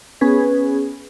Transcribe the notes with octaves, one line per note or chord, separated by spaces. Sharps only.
B3 C#4 G#4 B4